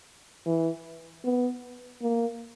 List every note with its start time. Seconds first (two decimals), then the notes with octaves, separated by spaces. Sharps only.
0.46 E3
1.24 B3
2.02 A#3